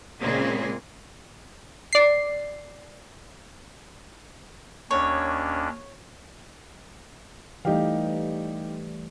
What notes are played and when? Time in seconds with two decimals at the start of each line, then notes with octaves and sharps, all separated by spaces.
0.20 A#2 C#3 G#3 A#3 C4 G#4
1.93 D5 C7
4.91 D#2 C#4 D4 C#5
7.65 E3 G3 A3 D#4 G4 F5